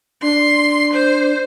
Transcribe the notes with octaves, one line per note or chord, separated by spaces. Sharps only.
D4 C6
C5